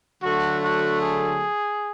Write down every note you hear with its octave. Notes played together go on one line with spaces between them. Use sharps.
D3 F#3 A3 F#4
F#4
G#4